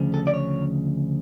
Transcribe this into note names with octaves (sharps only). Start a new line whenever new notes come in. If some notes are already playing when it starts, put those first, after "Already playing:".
Already playing: D2 C#3 F3
A4
D5
C#5